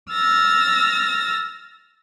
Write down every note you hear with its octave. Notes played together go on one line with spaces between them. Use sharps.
E6 F6 A6 A#6